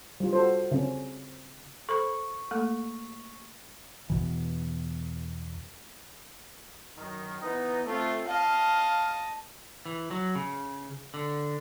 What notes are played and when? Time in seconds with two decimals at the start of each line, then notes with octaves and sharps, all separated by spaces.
0.20 G3 F4
0.33 F#4 A4 C5
0.71 C#3 C4 C#4
1.89 A4 C5 B5 C#6
2.51 A3 A#3 A4
4.10 E2 B2 E3
6.98 F#2 D#3
7.42 E3 B3 D#4
7.85 A3 C4 F4
8.28 D#5 F5 A5
9.86 E3
10.11 F#3
10.35 C#3
11.14 D3